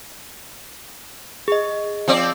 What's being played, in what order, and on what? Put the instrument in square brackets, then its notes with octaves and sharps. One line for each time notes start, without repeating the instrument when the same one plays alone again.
[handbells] G#4 D#5
[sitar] F3 C4 D5